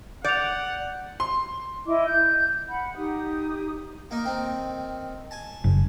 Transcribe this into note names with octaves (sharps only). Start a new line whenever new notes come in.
D5 F#5 G6 F7
C6
E4 D#5 D6
G6
F#5 B5
D#4 G4 D#6
A#3 D#4
D#3 C4
G#5 A5
F#1